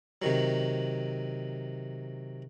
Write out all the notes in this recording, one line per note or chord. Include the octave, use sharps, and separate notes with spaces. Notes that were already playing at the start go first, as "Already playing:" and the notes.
C3 D#3 F#3